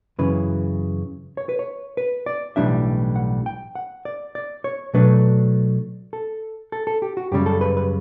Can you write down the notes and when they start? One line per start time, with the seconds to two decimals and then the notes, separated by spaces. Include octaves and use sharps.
0.18 F#2 C#3 E3 B4
1.37 C#5
1.49 B4
1.59 C#5
1.97 B4
2.26 D5
2.56 B1 A2 E3 G3 D4 E5
3.16 F#5
3.46 G5
3.75 F#5
4.05 D5
4.35 D5
4.64 C#5
4.94 B2 F#3 A3 D4 B4
6.13 A4
6.72 A4
6.87 A4
7.02 G4
7.17 F#4
7.32 F#2 C#3 G3 G4
7.46 A4
7.61 B4
7.77 B4